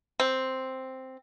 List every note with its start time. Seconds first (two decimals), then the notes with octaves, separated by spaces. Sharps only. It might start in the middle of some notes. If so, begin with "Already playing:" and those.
0.20 C4